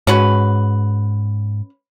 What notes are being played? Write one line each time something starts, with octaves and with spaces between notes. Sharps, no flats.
G#2 C#4 F#4 B4